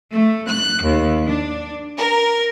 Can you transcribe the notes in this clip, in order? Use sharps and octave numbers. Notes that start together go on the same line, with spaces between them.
A3
F#6
D#2
D4
A#4